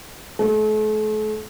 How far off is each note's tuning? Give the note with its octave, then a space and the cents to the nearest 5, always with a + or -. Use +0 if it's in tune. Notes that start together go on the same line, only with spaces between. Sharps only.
A3 -40